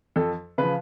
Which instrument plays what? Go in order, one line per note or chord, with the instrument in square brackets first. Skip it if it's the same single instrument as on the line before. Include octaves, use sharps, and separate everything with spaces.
[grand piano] F2 A4
C#3 F3 B4